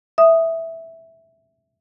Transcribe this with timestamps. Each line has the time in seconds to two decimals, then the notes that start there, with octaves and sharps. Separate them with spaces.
0.18 E5 D#6